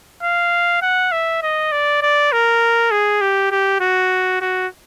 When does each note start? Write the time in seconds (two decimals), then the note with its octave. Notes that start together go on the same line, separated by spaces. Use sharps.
0.23 F5
0.82 F#5
1.12 E5
1.43 D#5
1.72 D5
2.02 D5
2.32 A#4
2.91 G#4
3.21 G4
3.51 G4
3.80 F#4
4.41 F#4